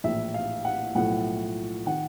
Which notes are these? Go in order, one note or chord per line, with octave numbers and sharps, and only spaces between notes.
A#1 A2 E3 E5
F5
F#5
B1 A2 F3 A3 F#5
D#3 F#5